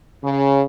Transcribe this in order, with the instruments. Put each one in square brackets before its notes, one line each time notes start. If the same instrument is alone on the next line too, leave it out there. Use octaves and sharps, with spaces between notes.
[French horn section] C#3